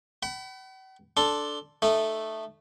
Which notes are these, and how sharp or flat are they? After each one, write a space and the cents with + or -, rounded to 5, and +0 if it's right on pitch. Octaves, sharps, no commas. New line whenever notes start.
F#5 +45 B5 +10
D4 +0 A4 +0 C6 +5
A3 +0 D#4 -25